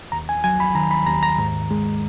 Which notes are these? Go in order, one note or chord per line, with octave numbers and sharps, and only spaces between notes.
D#2 A#5
G#5
F#3 G#5
B5
D#3 A#5
B5
D#2 A#5
A#5
G#2
G#3